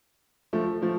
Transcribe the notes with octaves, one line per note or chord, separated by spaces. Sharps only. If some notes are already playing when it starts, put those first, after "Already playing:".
F3 A3
F3 A3